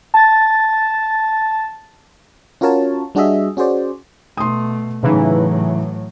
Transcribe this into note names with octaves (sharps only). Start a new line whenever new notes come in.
A5 A6
C#4 F4 F#4 A#4 C#5 A5
G3 D4 F#4 G#4 D#5 E5
C#4 F#4 G#4 C5 D5
B2 A3 C6 D#6
A2 C#3 E3 F#3 D#4